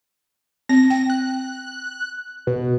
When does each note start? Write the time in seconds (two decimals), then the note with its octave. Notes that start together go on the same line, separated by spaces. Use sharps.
0.69 C4 A#6
0.90 G5
1.10 F#6
2.47 B2